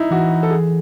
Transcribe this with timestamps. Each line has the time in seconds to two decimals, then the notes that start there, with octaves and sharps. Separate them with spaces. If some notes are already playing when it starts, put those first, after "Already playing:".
Already playing: D#4 E4
0.11 E3 F#4
0.43 A4
0.51 G#4